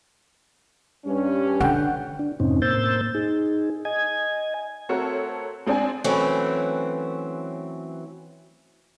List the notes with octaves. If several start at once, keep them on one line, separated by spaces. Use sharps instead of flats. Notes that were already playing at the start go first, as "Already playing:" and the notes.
G2 C#4
D3 F#5 G5
D4
F2 G#2 C3 C4 C#4 D#4
A2 A#3 C5 E6 G6 A6
D#4 G#4
D#5 G#5 G#6
A3 C4 F#4 A4 A#4 C#5
G#3 C4 D4 D5 G#5
E3 F#3 A3 C4 C#4